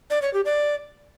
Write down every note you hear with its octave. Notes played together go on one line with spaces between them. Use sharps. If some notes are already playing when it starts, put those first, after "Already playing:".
D5
C#5
G4
D5